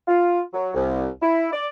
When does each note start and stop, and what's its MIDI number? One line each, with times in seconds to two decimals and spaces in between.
0.08 0.40 65
0.54 0.69 54
0.74 1.07 36
1.21 1.48 64
1.52 1.67 74